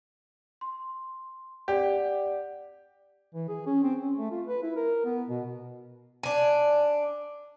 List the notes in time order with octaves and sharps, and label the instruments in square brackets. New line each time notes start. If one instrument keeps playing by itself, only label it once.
[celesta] C6
[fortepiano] G4 [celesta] D5 F#5
[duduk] E3
G#4
C#4
C4
C#4
A3
F4
B4
E4
A#4
B3
B2
[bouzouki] D4 G#5